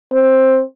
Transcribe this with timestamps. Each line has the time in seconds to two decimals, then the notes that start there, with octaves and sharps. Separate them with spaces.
0.12 C4